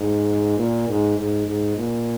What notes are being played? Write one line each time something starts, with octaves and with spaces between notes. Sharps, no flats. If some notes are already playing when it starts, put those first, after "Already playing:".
Already playing: G#2
A#2
G#2
G#2
G#2
A#2